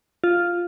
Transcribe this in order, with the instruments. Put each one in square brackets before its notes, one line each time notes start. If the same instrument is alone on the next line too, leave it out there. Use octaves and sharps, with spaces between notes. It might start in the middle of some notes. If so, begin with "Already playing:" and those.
[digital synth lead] F4